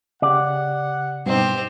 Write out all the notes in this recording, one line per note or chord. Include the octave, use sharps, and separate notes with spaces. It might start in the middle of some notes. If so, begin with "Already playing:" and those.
C#3 G4 D5 F#5
G2 B2 C4 D#4 G4